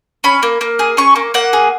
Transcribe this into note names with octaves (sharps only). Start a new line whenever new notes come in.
C#4 B5
A#3
A#3
G#4
C#4 C#6
A#3
A#3 F#5
G#4